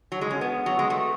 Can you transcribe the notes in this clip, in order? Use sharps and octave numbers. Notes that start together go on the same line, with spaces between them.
F#3
G#3
C#4
B3
F#3
G#3
A3